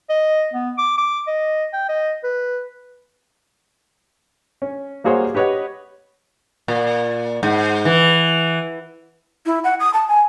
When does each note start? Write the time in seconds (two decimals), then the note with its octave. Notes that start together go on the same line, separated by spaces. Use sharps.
0.09 D#5
0.53 B3
0.78 D6
0.98 D6
1.27 D#5
1.73 G5
1.89 D#5
2.24 B4
4.62 C#4
5.04 G3 A#3 F#4 G#4 C5 C#5
5.35 G4 B4 C#5 D#5 F#5
6.68 A#2
7.43 G#2
7.85 E3
9.46 E4
9.64 F#5
9.80 D#6
9.94 A5
10.08 G#5